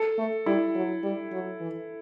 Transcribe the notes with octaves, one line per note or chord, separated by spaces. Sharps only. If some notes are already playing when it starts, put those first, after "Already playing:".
Already playing: A4
A3
G3 E4
F#3
G3
F#3
E3